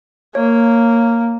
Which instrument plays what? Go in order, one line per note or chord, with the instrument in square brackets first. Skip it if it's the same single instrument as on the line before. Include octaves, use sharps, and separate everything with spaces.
[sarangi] A#3 [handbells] C#5